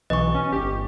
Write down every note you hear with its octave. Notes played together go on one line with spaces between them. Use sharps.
B1 E3 D#5 C#6
C#4
G1 G4